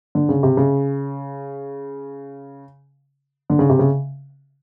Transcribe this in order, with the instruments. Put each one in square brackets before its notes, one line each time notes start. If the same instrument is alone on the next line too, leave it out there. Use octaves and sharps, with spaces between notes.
[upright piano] D3
C#3
C3
C#3
D3
C#3
C3
C#3